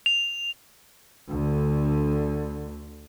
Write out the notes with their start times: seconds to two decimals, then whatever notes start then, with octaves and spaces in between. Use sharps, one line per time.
0.06 F7
1.28 D2 D3